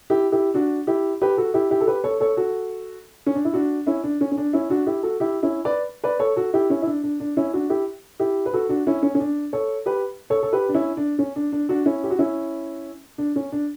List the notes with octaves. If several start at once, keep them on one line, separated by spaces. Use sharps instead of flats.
E4 G4
E4 G4
D4 F#4
E4 G4
G4 B4
F#4 A4
E4 G4
E4 G4
A4
G4 B4
A4 C#5
A4 C#5
F#4 A4
C#4
D4
E4
D4 F#4
C#4 E4
D4
C#4
C#4
D4
C#4 E4
D4 F#4
E4 G4
F#4 A4
E4 G4
C#4 E4
B4 D5
B4 D5
A4 C#5
F#4 A4
E4 G4
C#4 E4
E4
D4
D4
D4
C#4 E4
D4 F#4
E4 G4
E4 G4
B4
F#4 A4
D4 F#4
C#4 E4
C#4
C#4
D4
A4 C#5
G4 B4
A4 C#5
A4
G4 B4
D4
C#4 E4
D4
C#4
D4
D4
D4 F#4
C#4 E4
G4
F#4
C#4 E4
D4
C#4
D4